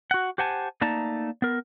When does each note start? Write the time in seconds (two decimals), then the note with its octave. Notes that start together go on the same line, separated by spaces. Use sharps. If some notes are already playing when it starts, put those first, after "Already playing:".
0.11 F#4 F#5
0.38 G4 C5 F#5 G#5 A5
0.81 A3 A#3 D#4 D5 A5 A#5
1.42 B3 A#4